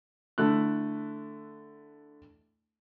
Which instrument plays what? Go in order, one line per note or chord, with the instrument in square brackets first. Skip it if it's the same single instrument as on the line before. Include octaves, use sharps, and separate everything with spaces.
[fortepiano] D3 A3 E4 F#6